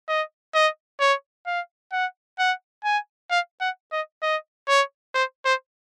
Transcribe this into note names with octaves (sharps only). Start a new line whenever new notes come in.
D#5
D#5
C#5
F5
F#5
F#5
G#5
F5
F#5
D#5
D#5
C#5
C5
C5